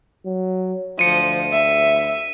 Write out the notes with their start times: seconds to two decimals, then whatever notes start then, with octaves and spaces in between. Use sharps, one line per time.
0.26 F#3
0.99 D2 F3 C#7 D#7
1.53 E5